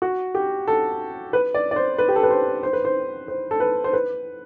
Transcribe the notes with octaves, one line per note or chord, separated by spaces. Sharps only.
F#4
G4
A4
B4
D5
D5
C5
B4
G4
A4
B4
C5
C5
B4
C5
C5
A4
B4
C5
B4